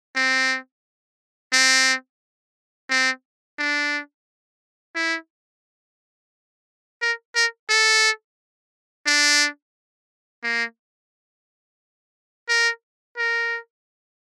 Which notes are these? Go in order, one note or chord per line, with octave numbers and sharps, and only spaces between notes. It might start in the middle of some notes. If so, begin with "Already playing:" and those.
C4
C4
C4
D4
E4
A#4
A#4
A4
D4
A#3
A#4
A#4